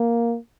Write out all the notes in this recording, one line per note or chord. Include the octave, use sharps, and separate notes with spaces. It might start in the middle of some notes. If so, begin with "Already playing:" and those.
Already playing: A#3